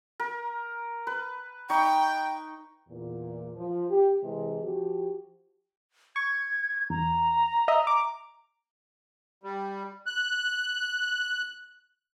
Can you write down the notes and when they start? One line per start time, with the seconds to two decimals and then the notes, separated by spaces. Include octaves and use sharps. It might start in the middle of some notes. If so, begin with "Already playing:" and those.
0.20 A#4
1.07 B4
1.70 D#4 G5 C#6
2.88 E2 A#2
3.56 F3
3.90 G4
4.23 C3 E3 G#3
4.62 F3 F#4 G4
6.16 C#6 G#6
6.90 E2 A#5
7.68 D#5 E5
7.87 D6
9.44 G3
10.06 F#6